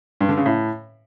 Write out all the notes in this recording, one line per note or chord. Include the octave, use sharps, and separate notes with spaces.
G2
D3
C#3
A2